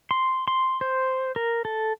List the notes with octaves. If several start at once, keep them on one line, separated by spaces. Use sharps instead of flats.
C6
C6
C5
A#4
A4